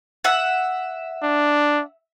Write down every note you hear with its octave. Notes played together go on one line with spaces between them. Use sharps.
E5 F#5
D4